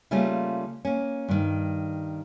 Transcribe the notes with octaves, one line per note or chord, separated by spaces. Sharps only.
C#3 G3 A3 A#3 C#4 F4
A#3 C#4
G2 D#3